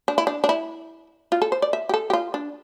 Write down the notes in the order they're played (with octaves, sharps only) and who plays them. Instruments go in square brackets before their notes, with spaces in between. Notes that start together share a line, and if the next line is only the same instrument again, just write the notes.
[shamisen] D4
E4
D4
D4
E4
F4
A4
C5
D5
E5
G4
A4
G4
F4
D4